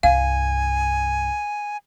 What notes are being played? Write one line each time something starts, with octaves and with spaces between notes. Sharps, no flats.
C2 G2 F5 G#5